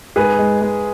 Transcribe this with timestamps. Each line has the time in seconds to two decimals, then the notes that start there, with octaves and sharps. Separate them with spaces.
0.16 G#2 G#4 B4
0.39 G#3
0.61 G#3